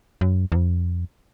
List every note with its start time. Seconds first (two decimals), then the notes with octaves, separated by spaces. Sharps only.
0.21 F#2
0.52 E2
0.56 F2